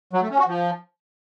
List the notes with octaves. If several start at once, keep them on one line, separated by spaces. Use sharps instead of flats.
F#3
A3
C#4
F#4
F3